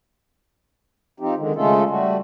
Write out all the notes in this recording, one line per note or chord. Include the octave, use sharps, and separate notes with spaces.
F3 C4 D#4 G4
D3 D#3 G#3
C#3 G#3 A3 C#4 F4 A4
G3 A3 F#4